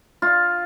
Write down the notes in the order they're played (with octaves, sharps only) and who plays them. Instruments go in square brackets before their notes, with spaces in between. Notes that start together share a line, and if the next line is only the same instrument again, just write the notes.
[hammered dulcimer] F4